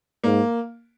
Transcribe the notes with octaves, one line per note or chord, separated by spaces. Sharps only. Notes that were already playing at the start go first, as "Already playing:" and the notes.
G#2 A#3